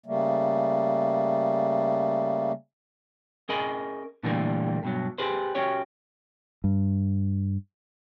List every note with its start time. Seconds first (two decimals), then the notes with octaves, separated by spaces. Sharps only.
0.06 C#3 G3 A3 A#3
3.49 C#4 G#4 A#4 D#5 G#5 B5
4.23 A#2 D3 E3 G3 A3 A#3
4.83 G2 B2 F#3
5.18 G4 G#4 B4 C5
5.55 C#4 F#4 G4 C#5
6.64 G2